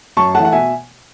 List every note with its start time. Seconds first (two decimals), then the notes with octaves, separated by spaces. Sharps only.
0.17 F#2 A5 C#6
0.35 E3 A3 F#5 A5
0.45 F#5
0.52 B2 E5 G#5